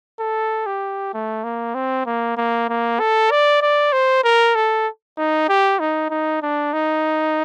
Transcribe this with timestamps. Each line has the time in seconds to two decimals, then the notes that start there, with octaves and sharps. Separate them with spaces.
0.19 A4
0.67 G4
1.14 A3
1.44 A#3
1.75 C4
2.06 A#3
2.37 A#3
2.69 A#3
3.00 A4
3.31 D5
3.62 D5
3.93 C5
4.24 A#4
4.55 A4
5.18 D#4
5.49 G4
5.80 D#4
6.10 D#4
6.42 D4
6.73 D#4